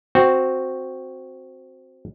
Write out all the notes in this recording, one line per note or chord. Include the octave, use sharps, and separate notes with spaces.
C4 F#4